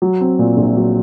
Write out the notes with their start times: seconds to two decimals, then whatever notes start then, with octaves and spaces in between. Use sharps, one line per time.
0.02 F#3
0.21 C4
0.39 A#2
0.57 A#1
0.77 F#3